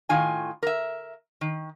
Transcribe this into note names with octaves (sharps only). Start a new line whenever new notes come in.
A2 D#3 F4 G#5
A#4 E5
D#3